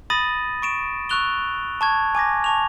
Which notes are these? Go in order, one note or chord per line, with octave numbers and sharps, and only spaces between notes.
B5 D#6 A6 A#6 D#7
C#6 D7 E7
C#6 E6 F#6 F7 G7
A5 C#6 G#6
G#5 D6 G#6 A#6
A5 C#6 F7